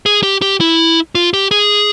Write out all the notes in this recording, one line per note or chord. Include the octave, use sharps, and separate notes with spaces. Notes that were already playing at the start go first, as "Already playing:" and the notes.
G#4
G4
G4
E4
F4
G4
G#4